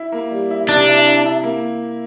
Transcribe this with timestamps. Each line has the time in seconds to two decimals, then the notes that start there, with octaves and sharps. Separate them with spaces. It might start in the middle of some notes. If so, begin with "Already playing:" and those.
Already playing: E4
0.12 A#3
0.31 G3
0.50 E4
0.69 C3 D4
0.88 E4
1.07 E4
1.25 E4
1.44 A#3